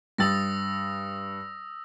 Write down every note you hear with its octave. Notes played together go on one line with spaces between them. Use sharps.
G2 D#6 E6 A6 A#6